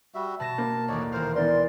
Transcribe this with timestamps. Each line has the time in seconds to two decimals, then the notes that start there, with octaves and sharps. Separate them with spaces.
0.15 G3 F#4 E5
0.40 B2 A5 A#6 E7
0.58 A#3
0.88 A1 D#2 D#4 C#5 D5
1.12 D#1 A#4 C5 F5
1.36 E3 B3 A#4 D5 C6